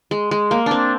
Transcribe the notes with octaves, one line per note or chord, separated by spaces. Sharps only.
G#3
G#3
A#3
C4 D4